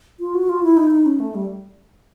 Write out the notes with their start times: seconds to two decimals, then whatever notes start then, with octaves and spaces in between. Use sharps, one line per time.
0.20 F4
0.34 F#4
0.49 F4
0.63 E4
0.77 D#4
0.91 D#4
1.06 C#4
1.20 A3
1.34 G3